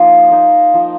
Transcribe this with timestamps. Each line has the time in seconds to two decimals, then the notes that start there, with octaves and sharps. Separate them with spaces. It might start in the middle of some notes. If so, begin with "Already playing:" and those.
Already playing: F3 A#3 D#4
0.31 A#3 D#4
0.74 F3